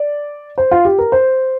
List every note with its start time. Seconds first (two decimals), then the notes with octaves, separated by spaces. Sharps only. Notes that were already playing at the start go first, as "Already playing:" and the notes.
Already playing: D5
0.58 C5
0.71 F4
0.85 G4
0.99 A#4
1.12 C5